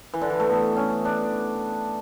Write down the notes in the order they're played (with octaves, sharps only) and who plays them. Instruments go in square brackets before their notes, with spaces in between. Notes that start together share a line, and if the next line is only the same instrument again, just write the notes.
[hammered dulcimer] E3
D3
E3
A3
B3
C#4
D4